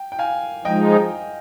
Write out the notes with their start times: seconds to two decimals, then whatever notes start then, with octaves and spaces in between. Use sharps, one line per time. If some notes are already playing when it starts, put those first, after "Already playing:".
Already playing: G5
0.12 G5
0.19 F5 G#5
0.64 F3 G#3 D#4 D#5 G5